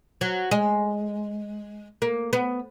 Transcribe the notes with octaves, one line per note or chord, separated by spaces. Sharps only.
F#3
G#3
A#3
B3